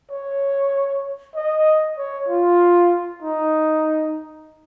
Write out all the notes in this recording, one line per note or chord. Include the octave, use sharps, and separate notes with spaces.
C#5
D#5
C#5
F4
D#4